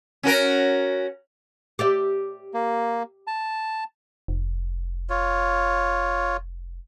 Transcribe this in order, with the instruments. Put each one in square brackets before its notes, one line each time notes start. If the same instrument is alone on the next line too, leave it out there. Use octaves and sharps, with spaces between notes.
[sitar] C#4 F#4 A#4
[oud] G4 D5 E5
[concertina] A#3
A5
[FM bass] F1
[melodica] F4 C#5